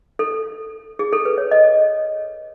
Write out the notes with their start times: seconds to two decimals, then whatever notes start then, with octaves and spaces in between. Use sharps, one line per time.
0.19 A4
0.99 G#4
1.13 A4
1.25 B4
1.38 C#5
1.51 D#5